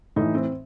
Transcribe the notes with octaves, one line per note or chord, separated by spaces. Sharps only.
A2 E3 D#4
C4